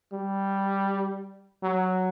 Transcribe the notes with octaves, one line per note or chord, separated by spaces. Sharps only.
G3
F#3